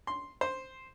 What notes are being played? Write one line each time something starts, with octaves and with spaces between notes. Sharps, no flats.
C6
C5